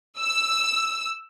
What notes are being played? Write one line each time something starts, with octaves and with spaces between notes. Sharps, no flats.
E6